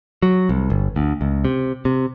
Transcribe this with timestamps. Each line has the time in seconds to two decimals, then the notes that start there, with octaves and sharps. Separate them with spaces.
0.23 F#3
0.49 C2
0.70 G1
0.96 D2
1.21 C#2
1.45 C3
1.85 C3